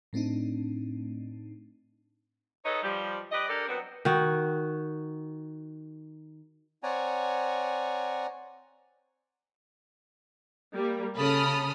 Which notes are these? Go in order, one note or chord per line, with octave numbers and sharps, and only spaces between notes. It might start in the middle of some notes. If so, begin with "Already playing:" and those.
A2 A3 C4 D4 D#4
D#4 G#4 A4 B4 C#5 D#5
F3 G3
G4 B4 D5 D#5
D4 G4 A4 A#4 D5
F#3 B3 C4
D#3 F#4
C4 C#5 D5 F#5 G#5 A#5
G3 A#3
C#3 A4 B5 D#6 F6